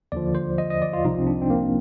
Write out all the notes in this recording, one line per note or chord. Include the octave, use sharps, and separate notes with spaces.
D#2 D3 F3 D5
C5
D#5
D#5
D5
F4
C2 C3 F3 D#4
C4
D4
C4
A#3